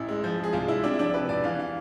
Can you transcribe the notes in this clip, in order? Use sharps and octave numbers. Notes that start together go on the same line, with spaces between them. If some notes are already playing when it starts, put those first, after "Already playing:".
Already playing: A1 E4
G#3
F3
G#3
G#4
C2 F4
G#3 E4
C3 D4
E4
F3 D4
C3 B4
E1 D5
E3 F5
F5